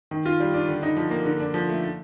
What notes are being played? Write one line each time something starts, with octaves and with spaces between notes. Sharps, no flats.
D#3
F4
G3
D4
D3
D#4
F3
A#3
D3
D4
F3
A3